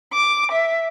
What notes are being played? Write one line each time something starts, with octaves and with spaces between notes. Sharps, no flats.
D6
E5